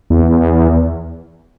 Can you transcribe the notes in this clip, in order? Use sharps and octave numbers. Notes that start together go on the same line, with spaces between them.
E2